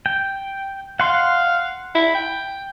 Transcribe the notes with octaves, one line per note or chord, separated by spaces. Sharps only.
G5
F5 F#5 C6
E4
G5